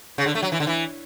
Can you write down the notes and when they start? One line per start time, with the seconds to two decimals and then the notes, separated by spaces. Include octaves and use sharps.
0.18 C#3
0.26 D3
0.35 A3
0.43 F#3
0.52 E3
0.60 D3
0.67 E3